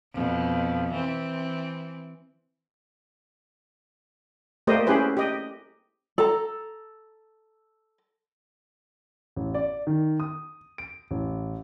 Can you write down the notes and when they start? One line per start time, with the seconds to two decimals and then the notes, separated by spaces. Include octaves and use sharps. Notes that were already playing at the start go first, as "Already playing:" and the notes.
0.13 F2 B2
0.91 E3 C4
4.67 A3 A#3 G4 C5 D5 D#5
4.87 C#4 E4 G4 G#4 B4 C5
5.17 G4 D#5
6.18 A4 A#5
9.36 A1
9.54 D5
9.87 D#3
10.20 D#6
10.78 D7
11.11 A1